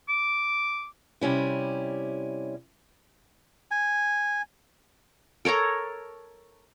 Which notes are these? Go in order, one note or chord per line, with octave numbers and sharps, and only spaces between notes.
D6
C3 G3 C#4 E4
G#5
A4 A#4 C#5 A#5